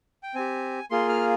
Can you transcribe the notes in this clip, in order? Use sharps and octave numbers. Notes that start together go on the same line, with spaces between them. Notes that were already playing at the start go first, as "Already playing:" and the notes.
G5
C4 G4 G#5
A#3 F4 G#4 C6
F6